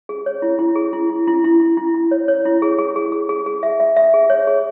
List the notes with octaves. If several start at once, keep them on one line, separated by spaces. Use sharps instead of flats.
G#4
C#5
E4
E4
G#4
E4
E4
E4
E4
E4
E4
E4
C#5
C#5
E4
G#4
G#4
G#4
G#4
G#4
G#4
E5
E5
E5
G#4
C#5
G#4